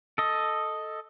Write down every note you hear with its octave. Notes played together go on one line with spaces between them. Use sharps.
A4 D#5